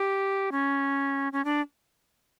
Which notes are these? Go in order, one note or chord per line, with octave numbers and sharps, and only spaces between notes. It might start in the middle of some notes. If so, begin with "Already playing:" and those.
Already playing: G4
C#4
C#4
D4